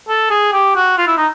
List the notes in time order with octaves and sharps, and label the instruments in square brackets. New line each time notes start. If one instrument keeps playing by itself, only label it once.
[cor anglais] A4
G#4
G4
F#4
F4
E4
D#4